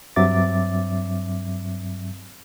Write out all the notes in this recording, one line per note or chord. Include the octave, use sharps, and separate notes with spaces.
G2 F#3 C4 E5 D6 A6